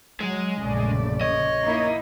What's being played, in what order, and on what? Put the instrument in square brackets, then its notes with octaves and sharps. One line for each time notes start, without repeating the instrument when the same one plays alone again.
[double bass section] F#3 [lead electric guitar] G#3
[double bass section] A#1 F#2 C#3 [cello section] A3 D5
[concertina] C#5 [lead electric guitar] D#5
[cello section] A#3 D#4 E4